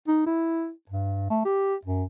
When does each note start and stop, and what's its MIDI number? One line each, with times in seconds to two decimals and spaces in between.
0.08 0.26 63
0.26 0.70 64
0.90 1.29 43
1.30 1.43 57
1.45 1.75 67
1.85 2.04 42